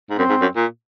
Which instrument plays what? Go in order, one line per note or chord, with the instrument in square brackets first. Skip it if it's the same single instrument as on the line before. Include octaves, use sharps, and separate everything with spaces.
[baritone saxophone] G#2
[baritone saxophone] F#2 [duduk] C4
[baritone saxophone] G#2
F#2
A#2